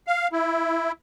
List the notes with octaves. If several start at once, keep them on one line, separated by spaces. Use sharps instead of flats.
F5
E4